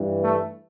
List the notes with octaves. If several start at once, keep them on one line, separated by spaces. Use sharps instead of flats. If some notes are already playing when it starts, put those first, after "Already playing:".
Already playing: G2 E3
A3